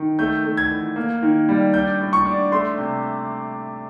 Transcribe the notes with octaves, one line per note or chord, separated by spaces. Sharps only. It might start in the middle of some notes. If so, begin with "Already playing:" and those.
Already playing: D#3
A3 G6
A3
G#6
E3
A#3
D#3
G3
D4 G6
A2
C#6
D4
A3 C6
C3